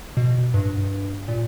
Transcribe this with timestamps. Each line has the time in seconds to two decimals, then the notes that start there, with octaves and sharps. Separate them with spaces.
0.17 B2
0.54 G2
1.28 A#2